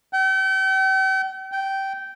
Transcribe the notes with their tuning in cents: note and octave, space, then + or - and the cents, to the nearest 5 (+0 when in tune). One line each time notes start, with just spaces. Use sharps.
G5 -40
G5 -15